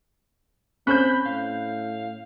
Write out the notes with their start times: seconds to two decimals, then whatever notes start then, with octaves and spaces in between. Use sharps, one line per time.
0.87 C4 C#4 C5 B5 F#6 G6
1.26 A2 F5